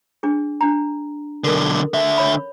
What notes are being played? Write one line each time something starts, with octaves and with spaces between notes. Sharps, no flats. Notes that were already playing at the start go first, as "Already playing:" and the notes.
D4 G#4
D4 A#5
B1 D3 A4 A#4
D3 E5
C#5 B5